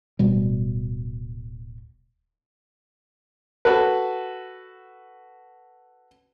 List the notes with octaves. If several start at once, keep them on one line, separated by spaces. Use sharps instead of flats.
D1 B2 G3
F#4 A4 B4